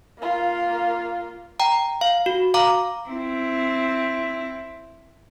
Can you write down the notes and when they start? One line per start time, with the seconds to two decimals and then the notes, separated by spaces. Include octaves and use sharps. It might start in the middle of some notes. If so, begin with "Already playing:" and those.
0.19 A#3 F4
1.60 G5 A#5
2.01 F5
2.26 F#4
2.54 F5 A#5 D6
3.09 C4 E4